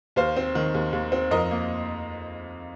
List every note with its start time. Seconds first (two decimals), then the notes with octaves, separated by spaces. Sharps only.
0.16 D#2 C5 F5
0.37 C4
0.55 D#3
0.74 D#2
0.93 D#2
1.12 C4
1.31 F2 A#4 D#5
1.51 A#3